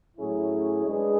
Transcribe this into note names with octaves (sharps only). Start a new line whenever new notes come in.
A2 F#3 C#4 E4 G#4
G#3 D4 G#4 B4